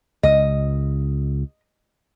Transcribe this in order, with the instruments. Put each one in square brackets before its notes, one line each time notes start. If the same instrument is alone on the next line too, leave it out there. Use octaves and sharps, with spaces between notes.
[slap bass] C#2 [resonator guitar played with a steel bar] D#5